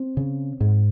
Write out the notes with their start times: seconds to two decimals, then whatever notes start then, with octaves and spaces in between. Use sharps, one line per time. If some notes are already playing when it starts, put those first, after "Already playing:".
Already playing: C4
0.17 C#3
0.60 G#2